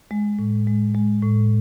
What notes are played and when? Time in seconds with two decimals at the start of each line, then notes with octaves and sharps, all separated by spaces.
0.11 G#3
0.39 A2
0.67 G#3
0.95 G#3
1.23 A2